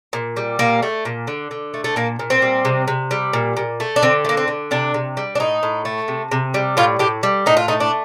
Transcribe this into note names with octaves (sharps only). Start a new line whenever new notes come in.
A#2
G3
A#2 A#3
A3
A#2
D3
D3
A3
A3
A#2 A#3
A#2
C4
G3
C3
C3
G3
A#2
A#2
A3
D4
D3 C4
A3
A#3
C4
D3
C3 D4
C3
G3
D4
A2 D#4
A2
A3
C3
C3
G3
A2 F4
A2 G4
G3
A2 D#4
F4
A3 D#4
D4